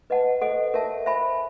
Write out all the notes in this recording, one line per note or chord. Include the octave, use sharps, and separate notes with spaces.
B4 D#5 F#5 A5
A4 C5 D#5 F#5
A#4 C#5 E5 A5
C5 E5 G#5 B5